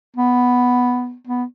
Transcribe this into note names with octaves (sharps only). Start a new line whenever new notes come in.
B3
B3